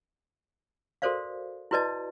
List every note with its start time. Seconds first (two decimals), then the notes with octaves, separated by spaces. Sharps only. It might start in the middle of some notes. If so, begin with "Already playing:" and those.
1.02 F#4 A4 A#4 C5 D5 F5
1.71 E4 F#4 B4 D5 D#5 A5